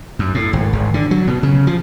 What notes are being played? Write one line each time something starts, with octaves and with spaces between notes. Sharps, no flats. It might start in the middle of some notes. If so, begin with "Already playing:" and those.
F#2
A2
G#1
G#1
D3
F#3
B2
C#3
F3